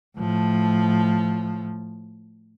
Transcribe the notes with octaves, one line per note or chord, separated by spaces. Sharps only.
A2 F3